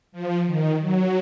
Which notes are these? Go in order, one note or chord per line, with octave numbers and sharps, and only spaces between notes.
F3
D#3
F#3